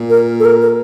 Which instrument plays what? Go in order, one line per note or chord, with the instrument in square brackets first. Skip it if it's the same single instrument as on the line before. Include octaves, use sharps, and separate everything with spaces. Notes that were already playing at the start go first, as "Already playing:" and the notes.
Already playing: [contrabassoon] A#2
[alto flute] A#4
A4
A#4
A#4